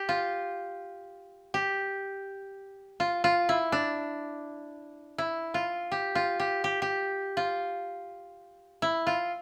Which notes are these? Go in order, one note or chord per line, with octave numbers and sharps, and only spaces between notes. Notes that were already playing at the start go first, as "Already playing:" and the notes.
Already playing: G4
F4
G4
F4
F4
E4
D4
E4
F4
G4
F4
G4
G4
G4
F4
E4
F4